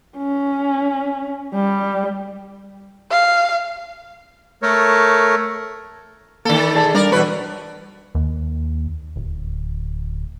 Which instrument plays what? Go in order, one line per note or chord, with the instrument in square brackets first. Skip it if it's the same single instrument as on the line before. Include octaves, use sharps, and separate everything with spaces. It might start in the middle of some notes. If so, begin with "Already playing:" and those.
[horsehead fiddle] C#4
G3
[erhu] F5
[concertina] A3 A4 A#4 C#5
[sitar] D#3 A4 [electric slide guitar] A#3 D4
[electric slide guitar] D5
G#4 D5 A5
[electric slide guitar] G3 D4 [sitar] A#4 D5
[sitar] B2 B4 [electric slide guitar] E3 F#4 C#5
[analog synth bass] D#2
D1